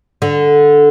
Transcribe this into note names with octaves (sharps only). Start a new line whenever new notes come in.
D3